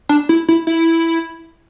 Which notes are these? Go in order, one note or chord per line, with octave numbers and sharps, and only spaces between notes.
D4
E4
E4
E4